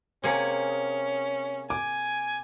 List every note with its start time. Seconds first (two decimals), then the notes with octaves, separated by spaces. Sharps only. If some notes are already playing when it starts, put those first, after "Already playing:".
0.24 C3 A#3 C#4 G#4
1.70 G#5 D6